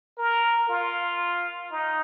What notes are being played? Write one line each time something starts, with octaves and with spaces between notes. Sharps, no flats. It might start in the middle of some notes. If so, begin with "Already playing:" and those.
A#4
F4
D#4